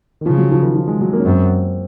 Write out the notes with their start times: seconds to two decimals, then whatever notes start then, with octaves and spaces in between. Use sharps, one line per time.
0.21 D#3
0.26 C#3 F3
0.38 F#3
0.51 F3
0.62 D#3
0.76 F3
0.88 G#3
1.01 F#3
1.13 A#3
1.19 C#4
1.25 F#2 C4